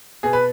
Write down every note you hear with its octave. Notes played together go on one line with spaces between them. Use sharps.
B2 G#4
B4